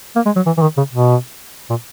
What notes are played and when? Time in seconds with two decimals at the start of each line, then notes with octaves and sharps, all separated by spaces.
0.16 A#3
0.26 G#3
0.36 F#3
0.46 E3
0.58 E3
0.62 D#3
0.77 C#3
0.93 B2
1.70 A#2